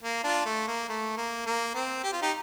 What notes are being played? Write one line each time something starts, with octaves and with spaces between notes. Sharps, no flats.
A#3
D4 F4
A3
A#3
A3
A#3
A#3
C4
G4
F4
D#4 G4